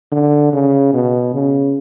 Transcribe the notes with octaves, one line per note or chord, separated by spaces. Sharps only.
D3
C#3
B2
C#3